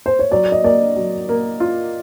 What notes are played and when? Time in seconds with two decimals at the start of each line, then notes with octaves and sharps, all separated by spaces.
0.06 C5
0.19 C#5
0.31 F#3 D5
0.52 D#5
0.64 A#3 D5
0.96 F#3
1.29 A#3
1.60 F4